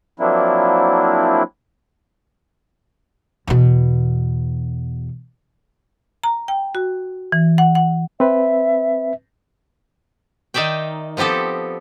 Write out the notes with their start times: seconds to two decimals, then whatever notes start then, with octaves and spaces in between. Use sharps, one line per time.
0.20 F3 F#3 A#3 C4 D4 E4
3.47 E2 B2
6.24 A#5
6.48 G5
6.75 F#4
7.32 E3
7.58 F#5
7.75 F#5
8.20 C4 B4 E5
10.54 D#3 D#4 D5 E5 G5
11.17 F3 B3 C4 G4 A4